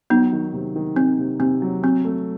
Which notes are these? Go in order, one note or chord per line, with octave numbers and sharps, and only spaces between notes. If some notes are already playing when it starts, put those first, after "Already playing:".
F#3 B3 D#4
D#3
C3
D#3
D#3 C4
C3
C3 C4
F#3
F#3 C4
A3